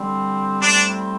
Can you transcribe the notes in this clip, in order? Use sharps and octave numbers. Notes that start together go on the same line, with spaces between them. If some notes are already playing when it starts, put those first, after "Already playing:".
Already playing: D3 G3 C4
A2 G3 C4 D4